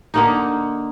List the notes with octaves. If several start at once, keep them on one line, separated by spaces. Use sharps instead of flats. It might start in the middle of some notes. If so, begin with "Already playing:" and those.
D3 A#3 D#4